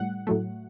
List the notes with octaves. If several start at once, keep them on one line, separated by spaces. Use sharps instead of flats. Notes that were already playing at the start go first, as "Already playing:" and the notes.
Already playing: A2 G3 F#5
A2 F#3 A3